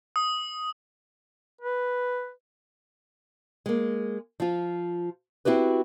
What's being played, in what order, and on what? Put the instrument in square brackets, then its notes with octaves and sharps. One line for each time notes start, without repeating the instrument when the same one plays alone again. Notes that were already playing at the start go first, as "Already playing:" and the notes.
[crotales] D#6
[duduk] B4
[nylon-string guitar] G#3 A#3
F3 F4
C4 E4 F#4 G4 B4